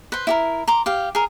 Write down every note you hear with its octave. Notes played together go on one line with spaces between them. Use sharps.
B4 C5
E4 G4 A#4
A#5 C6 D6
G4 F5
G#4 A#4